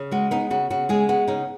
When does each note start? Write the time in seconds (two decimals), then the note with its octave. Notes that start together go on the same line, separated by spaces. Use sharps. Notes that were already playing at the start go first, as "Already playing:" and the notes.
Already playing: C#3
0.11 G#3 F#4
0.31 B3 D#4
0.50 C#3 F#4
0.70 C#3 F#4
0.89 G#3 G#4
1.09 B3 F#4
1.28 C#3 D#4